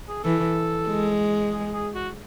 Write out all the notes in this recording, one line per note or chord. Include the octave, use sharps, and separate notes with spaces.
G#4
E3 A4
G#3
G#4
G#4
F#4